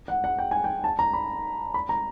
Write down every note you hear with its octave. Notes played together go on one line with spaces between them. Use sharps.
F#5
F#5
G5
G#5
G5
A5
A#5
B5
B5
A#5